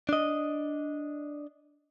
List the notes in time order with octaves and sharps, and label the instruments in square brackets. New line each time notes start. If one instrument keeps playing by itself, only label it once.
[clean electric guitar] D4 D#5